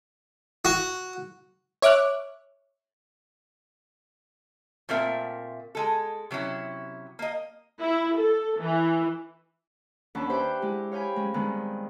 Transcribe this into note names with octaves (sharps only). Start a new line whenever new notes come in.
F#4
C#5 E5 D6 F6 F#6
A#2 A3 C4 A#4 E5
G#3 A4
C3 F#3 C#4 E4
A#3 D#5
E4
A4
E3
D#2 C#4 D4 F#5 B5
G4 B4 C5 E5 F#5 G5
G#3 E4 G4
C#5 F5 G5 G#5 B5
G#3 C#4
G2 D#3 G#3 B3 C4